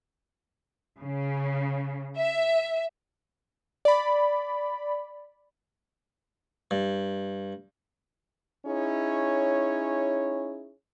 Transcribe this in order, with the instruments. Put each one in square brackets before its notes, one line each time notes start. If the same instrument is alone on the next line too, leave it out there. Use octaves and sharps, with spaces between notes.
[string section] C#3
E5
[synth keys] D5 B5
[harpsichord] G2
[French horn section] C#4 D#4 E4 G#4 C#5